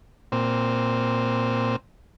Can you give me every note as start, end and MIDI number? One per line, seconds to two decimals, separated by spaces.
0.32 1.76 46
0.32 1.76 60